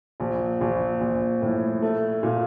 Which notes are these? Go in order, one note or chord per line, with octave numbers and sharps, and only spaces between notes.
A#1
A#1
A#1
A2
A3
A#2